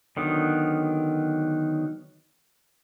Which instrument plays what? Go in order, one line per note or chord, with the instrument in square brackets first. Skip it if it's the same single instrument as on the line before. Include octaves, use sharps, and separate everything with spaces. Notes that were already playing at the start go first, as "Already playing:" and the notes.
[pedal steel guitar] D3 D#3 F#3 B3